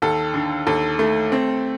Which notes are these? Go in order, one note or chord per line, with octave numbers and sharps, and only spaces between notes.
D#2 A4
D3
D#2 A4
A3
C4